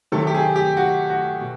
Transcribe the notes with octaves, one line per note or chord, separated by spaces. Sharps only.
C3 D#3 F#3 A3 A4
G4
G#4
G4
F#4
F#4
B2